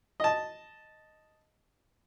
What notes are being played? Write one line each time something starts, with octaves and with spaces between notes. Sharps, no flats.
D#5 A5